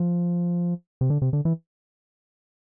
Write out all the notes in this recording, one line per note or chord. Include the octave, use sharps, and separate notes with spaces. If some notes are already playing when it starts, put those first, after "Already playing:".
Already playing: F3
C3
D3
C3
D3
E3